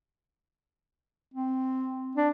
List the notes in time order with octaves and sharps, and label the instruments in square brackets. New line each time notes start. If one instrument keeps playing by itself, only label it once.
[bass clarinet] C4
[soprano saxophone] D4